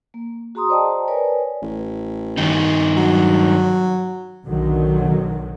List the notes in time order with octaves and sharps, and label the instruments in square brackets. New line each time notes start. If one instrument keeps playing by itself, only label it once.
[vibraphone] A#3
F#4 G#4 A#5 C6 D#6
C5 D5 D#5 G5 A5 A#5
A#4 B4 C#5 D5 G#5
[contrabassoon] A1
[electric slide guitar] G2 D#3 D#4
[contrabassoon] F#3
[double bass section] B1 D3 D#3 F#3